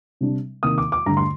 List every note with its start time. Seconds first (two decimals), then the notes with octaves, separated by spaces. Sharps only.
0.21 C3 G3 D4
0.63 C3 D#3 A#3 D#6
0.78 D6
0.92 D6
1.06 G2 D3 A3 D4 A#5
1.17 C6